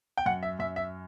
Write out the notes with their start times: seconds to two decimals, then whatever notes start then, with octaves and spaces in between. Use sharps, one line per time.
0.17 G5
0.26 F#2 F#5
0.43 E5
0.59 F#2 E5
0.76 E5